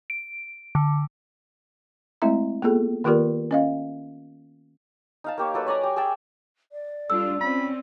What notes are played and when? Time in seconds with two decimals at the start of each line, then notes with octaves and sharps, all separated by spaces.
0.10 D7
0.75 D3
2.22 G#3 A3 C4 E4 E5 A#5
2.62 A#3 B3 F4 G#4 A4
3.04 D#3 A#3 F4 G4 A#4 D5
3.51 C#4 D#5 F5
5.24 D#4 F5 A5
5.38 A#3 G4 C#5
5.54 F#3 A4 B4
5.66 C#5 D5 G#5 A#5
5.83 G4
5.96 G#4 E5 G5 A5
6.72 D5
7.10 G3 D4 F4 A4 E6
7.41 C4 C#4 B5